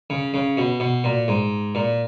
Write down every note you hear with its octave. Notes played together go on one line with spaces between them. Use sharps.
C#3
C#3
B2
B2
A#2
G#2
A#2